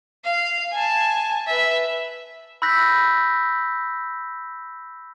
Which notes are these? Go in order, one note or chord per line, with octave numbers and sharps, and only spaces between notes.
F5
G#5 A5
B4 E5
B5 E6 F#6 G6 A#6 B6